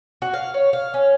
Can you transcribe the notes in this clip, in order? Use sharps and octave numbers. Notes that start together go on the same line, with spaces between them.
F#4
F5
C#5
F5
C#4